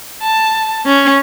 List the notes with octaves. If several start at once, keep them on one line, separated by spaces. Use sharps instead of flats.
A5
C#4